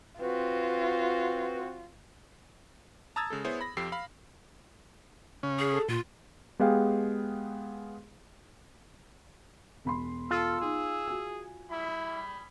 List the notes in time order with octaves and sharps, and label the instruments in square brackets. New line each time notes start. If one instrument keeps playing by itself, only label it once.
[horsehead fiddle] C4 F#4 [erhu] F4 [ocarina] B4
[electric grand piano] A5 A#5 D#6 E6 G#6 A6
C#3 G#3 A4
B3 E4 G#4 C5 C#5
B5 A#6
F2 F3 G4 A4 E6 C7
F5 B5
[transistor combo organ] C#3 C#4
[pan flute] G#4
[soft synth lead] A4
[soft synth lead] A#2 [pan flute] F4
[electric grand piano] G#3 B3 G4 G#4 F5 G5
[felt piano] E1 B5 C6
[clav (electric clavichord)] F4 [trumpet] A4 [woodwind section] E6
[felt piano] D#4 [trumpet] G#4
[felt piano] F#4 G#5
[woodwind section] G3 G#4 B5 [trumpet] E4